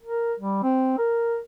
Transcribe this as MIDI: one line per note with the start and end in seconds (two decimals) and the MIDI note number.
0.03 0.34 70
0.40 0.61 55
0.63 0.93 60
0.98 1.38 70